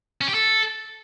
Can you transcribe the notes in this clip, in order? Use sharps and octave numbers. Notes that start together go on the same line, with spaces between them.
C#4
G4
A4